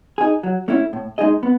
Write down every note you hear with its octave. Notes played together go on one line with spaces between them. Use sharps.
D#4 G#4
F#3
A3 C#4 E4
A2
G#3 D#4 G#4 D#5
B3